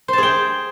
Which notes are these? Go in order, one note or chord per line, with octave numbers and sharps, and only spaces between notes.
G#4 C5 G5 A5